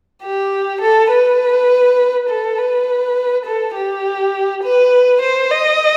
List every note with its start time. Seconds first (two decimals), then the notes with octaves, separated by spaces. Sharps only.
0.23 G4
0.81 A4
1.11 B4
2.29 A4
2.58 B4
3.45 A4
3.76 G4
4.64 B4
5.22 C5
5.51 D#5